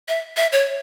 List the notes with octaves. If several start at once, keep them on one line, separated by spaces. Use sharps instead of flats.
E5
E5
C#5